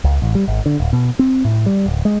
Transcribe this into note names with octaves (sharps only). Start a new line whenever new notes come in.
C#2
A1
G3
G#1
D3
D1
B2
C4
A2
G3
D1
G#3